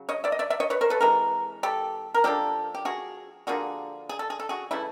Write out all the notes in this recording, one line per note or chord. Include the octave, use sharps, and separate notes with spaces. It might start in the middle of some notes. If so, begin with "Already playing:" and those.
Already playing: C#3 F#3
C#5 D#5
D5 E5
D#5
D5 E5
D5 E5
C#5 D#5
B4 C#5
A#4 C5
A4 B4
C3 E3 G#3 A#4
G4 A4
A#4
F3 A#3 D4 G4 A4
G4
F#4 G#4
D3 F3 A#3 F#4 G#4
G#4
A4
G#4
A4
F#4 G#4
C#3 E3 A3 E4